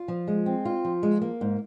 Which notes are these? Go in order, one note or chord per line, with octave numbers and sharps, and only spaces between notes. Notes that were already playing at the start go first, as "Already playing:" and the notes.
Already playing: F4
F3
G#3
C4
F4
F3
G#3
A#3
G#2